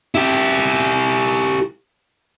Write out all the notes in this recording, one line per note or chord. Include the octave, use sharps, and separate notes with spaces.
E4 G4